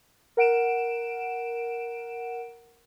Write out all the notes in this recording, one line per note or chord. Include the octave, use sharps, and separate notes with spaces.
A#4 F#5 D7 E7